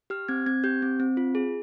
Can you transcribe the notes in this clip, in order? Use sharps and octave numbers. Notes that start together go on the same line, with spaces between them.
G4 F6
C4 G#6
C4 G#6
G4 G6
C4
C4
F4
G#4